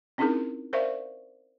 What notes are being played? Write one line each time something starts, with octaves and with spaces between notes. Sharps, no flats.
C4 C#4 D#4 E4 G#4 A#4
A#4 C5 D5 E5 F5 C#6